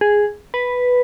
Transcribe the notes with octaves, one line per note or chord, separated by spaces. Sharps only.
G#4
B4